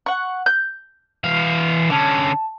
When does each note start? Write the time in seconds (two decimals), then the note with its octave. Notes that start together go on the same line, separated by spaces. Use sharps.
0.06 F#5 C#6
0.46 G6
1.24 E3 F5
1.90 D3 C#4 A5